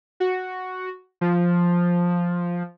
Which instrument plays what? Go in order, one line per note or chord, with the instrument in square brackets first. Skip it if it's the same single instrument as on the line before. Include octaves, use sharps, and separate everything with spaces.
[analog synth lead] F#4
F3